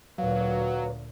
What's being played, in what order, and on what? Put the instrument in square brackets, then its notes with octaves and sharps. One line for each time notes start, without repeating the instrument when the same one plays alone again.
[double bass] D2 A#2 [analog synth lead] F#3 [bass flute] B4 [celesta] F5